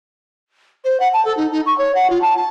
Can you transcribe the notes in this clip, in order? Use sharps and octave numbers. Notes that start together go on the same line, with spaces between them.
C5
F#5
A5
A4
D#4
D#4
C#6
C#5
F#5
F4
A5
A5